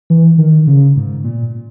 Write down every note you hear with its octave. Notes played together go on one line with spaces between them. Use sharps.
E3
D#3
C#3
G#2
A#2